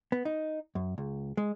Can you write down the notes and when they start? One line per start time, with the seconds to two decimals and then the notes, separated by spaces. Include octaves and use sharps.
0.12 B3
0.25 D#4
0.75 F#2
0.98 C#2
1.37 G#3